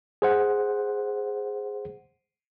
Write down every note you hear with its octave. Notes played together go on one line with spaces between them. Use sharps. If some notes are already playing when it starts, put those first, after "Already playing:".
G#4 C5 F#5